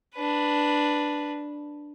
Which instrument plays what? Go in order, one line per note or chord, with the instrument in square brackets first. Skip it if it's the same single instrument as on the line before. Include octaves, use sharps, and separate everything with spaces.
[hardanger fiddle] D4 B4